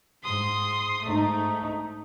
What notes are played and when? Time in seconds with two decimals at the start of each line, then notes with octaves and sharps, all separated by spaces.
0.24 G#2 C6 D#6
1.03 G#2 A3 D#4